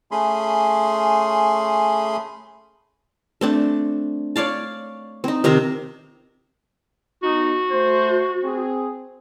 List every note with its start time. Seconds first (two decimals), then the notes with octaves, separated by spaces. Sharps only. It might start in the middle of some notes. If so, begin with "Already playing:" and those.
0.11 A3 C#4 G#4 B5 C6
3.41 A3 C4 D4
4.36 C#5 D5 F5 A5
5.24 C4 D#4
5.44 C3 D#3 C4 A#5
7.23 B3 D#4 F#4
7.71 A3 C5
8.43 C4 G#4